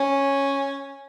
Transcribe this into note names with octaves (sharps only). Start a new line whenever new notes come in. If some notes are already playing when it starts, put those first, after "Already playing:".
Already playing: C#4